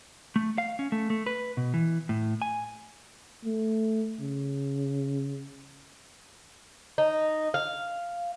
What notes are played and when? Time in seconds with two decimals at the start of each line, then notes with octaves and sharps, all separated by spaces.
0.36 A3
0.58 F5
0.79 C#4
0.92 A3
1.10 A3
1.26 B4
1.57 B2
1.74 E3
2.09 A2
2.42 G#5
3.45 A3
4.21 C#3
6.98 D#4
7.54 F5